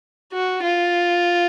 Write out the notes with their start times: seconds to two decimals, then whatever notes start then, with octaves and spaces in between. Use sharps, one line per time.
0.33 F#4
0.63 F4